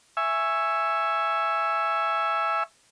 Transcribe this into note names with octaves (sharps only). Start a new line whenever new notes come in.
E5 G#5 C#6 E6